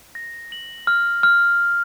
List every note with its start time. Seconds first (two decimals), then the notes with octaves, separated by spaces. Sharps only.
0.15 A#6
0.52 F#7
0.87 F6
1.23 F6